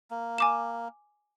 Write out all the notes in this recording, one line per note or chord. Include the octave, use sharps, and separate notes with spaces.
A#3
G#5 D6 E7